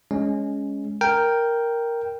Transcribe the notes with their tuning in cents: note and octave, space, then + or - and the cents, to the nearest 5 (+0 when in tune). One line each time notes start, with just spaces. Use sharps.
G#3 +0 C#4 +10
A#4 +0 G5 +0